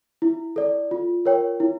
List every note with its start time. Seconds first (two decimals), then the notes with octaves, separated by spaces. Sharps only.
0.22 E4
0.56 A4 D5
0.91 F4
1.26 A#4 C#5 G5
1.60 E4